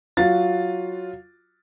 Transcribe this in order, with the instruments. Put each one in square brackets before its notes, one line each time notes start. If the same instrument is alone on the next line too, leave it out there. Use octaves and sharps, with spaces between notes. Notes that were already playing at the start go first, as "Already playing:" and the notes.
[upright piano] F#3 F4 F#4 A6